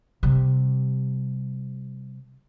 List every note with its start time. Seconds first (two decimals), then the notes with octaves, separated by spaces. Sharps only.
0.23 C3 G3